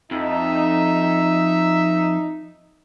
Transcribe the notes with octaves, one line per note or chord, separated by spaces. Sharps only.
F2 D#4 E5